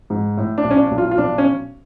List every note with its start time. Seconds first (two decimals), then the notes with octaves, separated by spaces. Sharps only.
0.10 G#2
0.37 A2
0.58 D4
0.64 B1
0.71 C#4
0.78 D4
0.91 B1
0.98 F4
1.11 F4
1.18 B1 D4
1.38 C#4